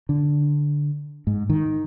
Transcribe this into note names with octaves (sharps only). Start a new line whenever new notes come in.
D3
G#2
D#3